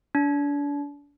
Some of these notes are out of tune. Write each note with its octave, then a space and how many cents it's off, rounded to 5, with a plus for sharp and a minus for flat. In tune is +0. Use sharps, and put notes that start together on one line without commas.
D4 -35